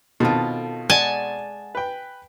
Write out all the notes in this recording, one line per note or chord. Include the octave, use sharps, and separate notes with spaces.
B2 D#3 C4 F4 A4
G#3 D5 F#5 G#5 A5
B4 G5